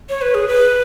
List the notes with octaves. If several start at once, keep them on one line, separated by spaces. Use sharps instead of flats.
C#5
B4
G#4
B4